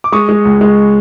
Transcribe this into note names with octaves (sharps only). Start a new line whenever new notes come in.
D6
G#3 C#6 D#6
G#3
C#2
G#3